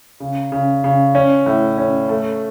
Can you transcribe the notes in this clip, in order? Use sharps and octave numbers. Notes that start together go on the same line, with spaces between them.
C#3
C#3
C#3
C#4
A2
C#4
A3